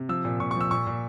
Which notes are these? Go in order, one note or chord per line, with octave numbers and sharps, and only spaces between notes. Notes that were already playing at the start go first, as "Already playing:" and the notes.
Already playing: C3
F3 E6
A#2
A#2 C#6
C#6
F3
E6
A#2 C#6
A#2